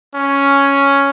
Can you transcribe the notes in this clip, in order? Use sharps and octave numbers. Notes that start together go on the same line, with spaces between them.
C#4